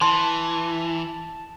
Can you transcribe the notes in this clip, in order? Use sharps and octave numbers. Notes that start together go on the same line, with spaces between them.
E3 A5 C6